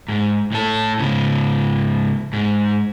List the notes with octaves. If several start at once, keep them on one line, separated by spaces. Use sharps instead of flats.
G#2
A2 A4
G#2 C#3
G#2